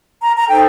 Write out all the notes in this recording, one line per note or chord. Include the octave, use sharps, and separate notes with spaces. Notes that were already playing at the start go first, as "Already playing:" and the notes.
A#5
A#5
D#4 A4 C5 G5